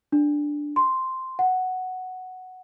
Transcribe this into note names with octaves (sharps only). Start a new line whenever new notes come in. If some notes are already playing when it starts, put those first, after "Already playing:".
D4
C6
F#5